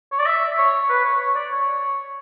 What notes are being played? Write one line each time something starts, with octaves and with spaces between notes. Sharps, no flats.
C#5
D5
E5
C#5
B4
C#5
C#5
D5
C#5